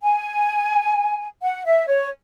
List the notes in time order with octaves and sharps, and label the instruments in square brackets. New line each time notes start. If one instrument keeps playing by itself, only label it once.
[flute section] G#5
F#5
E5
C#5